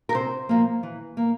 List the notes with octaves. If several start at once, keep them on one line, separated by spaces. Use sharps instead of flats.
A#4
C3 C5
F3 A#3
E3
A#3